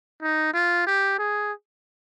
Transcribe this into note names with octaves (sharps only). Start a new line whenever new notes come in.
D#4
F4
G4
G#4